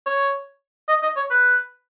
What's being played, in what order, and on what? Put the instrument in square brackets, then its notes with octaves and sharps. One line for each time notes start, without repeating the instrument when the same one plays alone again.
[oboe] C#5
D#5
D#5
C#5
B4